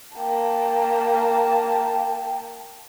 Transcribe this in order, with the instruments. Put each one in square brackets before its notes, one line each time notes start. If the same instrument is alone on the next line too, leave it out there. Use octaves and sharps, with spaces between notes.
[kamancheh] A#3 A5 [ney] G5